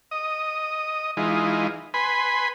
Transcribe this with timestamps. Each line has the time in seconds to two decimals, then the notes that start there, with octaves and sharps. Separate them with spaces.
0.11 D#5
1.17 E3 G#3 D#4 F4
1.94 B4 G#5 B5 C6